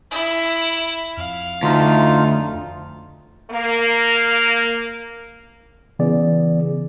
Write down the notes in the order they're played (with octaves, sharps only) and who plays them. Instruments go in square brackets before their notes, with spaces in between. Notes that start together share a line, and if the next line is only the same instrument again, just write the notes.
[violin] E4
[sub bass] F2 [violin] F5
[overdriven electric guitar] D2 [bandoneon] D#4 F4
[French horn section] A#3
[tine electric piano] C#3 E3 B3 G#4 D5